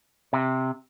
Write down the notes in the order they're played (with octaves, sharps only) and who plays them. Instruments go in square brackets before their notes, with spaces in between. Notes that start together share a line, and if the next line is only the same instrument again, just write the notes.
[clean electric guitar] C3